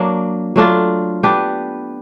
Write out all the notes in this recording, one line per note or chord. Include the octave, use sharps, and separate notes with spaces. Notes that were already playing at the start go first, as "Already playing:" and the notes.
Already playing: F#3 A#3 D4
F#3 A3 D4 F4
B3 D4 G4 B4